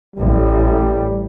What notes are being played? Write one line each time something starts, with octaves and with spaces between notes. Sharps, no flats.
A1 G3